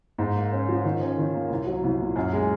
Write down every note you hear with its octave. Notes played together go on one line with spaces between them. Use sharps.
G#2
A#3
C#4
F3
D#3
C#4
D#3
A#3
C2
F#3
C2
A#2
F#2
G#3